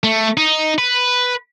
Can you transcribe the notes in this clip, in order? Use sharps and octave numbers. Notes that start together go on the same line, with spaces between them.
A3
D#4
B4